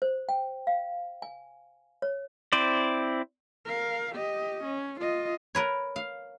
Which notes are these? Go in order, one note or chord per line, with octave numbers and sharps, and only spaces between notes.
C5
G5
F5
G#5
C#5
C4 E4 C5 D5
A#4 F5
G4 D#5
C#4
F4 D#5
A#4 B4 C#5
F5